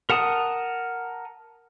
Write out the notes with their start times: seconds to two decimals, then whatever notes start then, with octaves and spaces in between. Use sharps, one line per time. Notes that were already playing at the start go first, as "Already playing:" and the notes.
0.10 A#4 F#5 A5 D#6